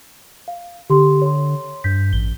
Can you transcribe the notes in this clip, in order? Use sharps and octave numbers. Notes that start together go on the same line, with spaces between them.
F5
D3 G4 C6
C#5 C6
G2 G6 B6
A1 G7